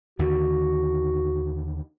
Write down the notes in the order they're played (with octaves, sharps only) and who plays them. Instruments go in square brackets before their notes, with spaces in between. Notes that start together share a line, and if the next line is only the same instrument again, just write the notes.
[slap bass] D#2 D3 D#3 [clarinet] F#4